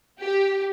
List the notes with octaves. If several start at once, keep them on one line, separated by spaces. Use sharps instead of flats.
G4